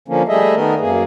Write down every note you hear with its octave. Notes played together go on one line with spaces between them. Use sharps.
D3 F3 A#3 C#4
G3 A3 G#4 D#5 E5
D#3 A3 B3 A#4
F#2 A#3 G#4